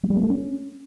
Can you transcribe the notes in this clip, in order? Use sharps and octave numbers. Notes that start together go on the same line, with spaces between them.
F#3
G3
A#3
A3
C#4